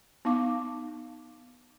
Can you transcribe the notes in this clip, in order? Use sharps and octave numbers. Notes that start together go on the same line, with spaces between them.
B3 D#4 F5 D6